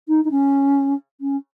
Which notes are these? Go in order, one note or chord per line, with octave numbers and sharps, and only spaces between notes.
D#4
D#4
C#4
C#4